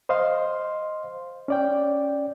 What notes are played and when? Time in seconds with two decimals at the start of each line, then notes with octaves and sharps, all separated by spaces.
0.09 C5 D#5 F5 C6
1.48 C#4 D5 G5